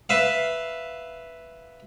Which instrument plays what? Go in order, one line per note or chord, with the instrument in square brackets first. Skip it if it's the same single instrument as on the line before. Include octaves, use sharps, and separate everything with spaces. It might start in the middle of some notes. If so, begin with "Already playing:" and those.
[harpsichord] B4 E5 F5